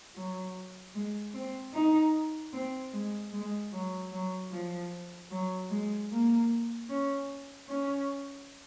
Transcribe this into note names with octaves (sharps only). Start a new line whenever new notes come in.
F#3
G#3
C4
D#4
C4
G#3
G#3
F#3
F#3
F3
F#3
G#3
A#3
C#4
C#4